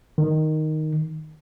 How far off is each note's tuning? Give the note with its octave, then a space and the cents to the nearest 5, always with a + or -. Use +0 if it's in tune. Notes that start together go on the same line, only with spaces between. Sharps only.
D#3 +0